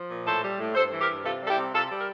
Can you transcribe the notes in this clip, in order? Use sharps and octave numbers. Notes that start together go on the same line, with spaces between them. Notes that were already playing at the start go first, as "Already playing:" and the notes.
Already playing: F3
A#2
A2 A4 C5
G3
A2
G2 A4 C5
E3
G4 A#4
G2
C3 F4 A4
G3 A4
E4 G4
C3
C3 F4 A4
G3
A#4